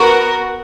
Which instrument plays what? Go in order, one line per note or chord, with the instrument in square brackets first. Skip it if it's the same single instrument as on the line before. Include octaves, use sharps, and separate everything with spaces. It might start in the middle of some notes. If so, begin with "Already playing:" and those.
Already playing: [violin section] B3 F#4 A#4